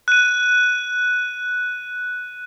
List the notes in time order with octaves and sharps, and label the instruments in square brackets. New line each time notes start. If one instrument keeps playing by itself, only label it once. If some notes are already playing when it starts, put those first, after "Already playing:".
[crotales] F#6 D#7